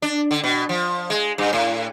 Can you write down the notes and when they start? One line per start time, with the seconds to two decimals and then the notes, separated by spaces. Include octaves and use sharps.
0.02 D4
0.31 D3
0.44 B2
0.69 F3
1.10 G#3
1.38 G2
1.53 A2